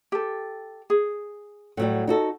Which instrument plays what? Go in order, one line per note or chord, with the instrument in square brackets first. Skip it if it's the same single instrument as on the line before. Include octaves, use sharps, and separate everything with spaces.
[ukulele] G4 A4
G#4
[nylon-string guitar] A2 F#3 G3 [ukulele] F#5
[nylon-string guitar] D#4 F#4 A4